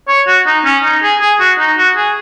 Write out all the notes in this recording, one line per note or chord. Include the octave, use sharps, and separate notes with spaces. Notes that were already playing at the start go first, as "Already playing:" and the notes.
C#5
F#4
D#4
C#4
D#4
G#4
G#4
F#4
D#4
F#4
G#4